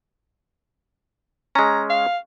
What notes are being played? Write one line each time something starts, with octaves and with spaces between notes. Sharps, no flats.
G#3 C#4 A#5
F5